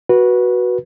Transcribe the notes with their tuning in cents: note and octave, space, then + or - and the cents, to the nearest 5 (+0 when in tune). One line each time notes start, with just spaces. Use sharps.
F#4 +0 B4 -15